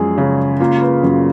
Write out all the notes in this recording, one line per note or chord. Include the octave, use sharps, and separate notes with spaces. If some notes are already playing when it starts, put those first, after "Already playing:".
Already playing: F#2 F3 G#3 G#4
C#3
A#3 F4
B4
F#2